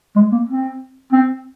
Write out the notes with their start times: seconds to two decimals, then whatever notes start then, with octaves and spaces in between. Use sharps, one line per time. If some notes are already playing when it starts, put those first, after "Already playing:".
0.16 G#3
0.32 A#3
0.49 C4
1.12 C4